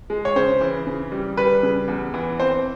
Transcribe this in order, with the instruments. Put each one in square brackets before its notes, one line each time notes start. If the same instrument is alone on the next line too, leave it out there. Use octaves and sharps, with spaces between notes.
[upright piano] G#3
C#5
C#3 C5
E3
C#3
G3
G3 B4
C#3
E2
E3
C4 C5